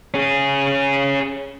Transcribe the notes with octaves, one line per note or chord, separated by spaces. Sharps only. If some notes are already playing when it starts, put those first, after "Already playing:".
C#4 G#4